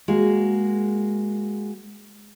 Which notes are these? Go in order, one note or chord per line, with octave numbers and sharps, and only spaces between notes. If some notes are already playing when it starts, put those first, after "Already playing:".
G#3 A#3 F#4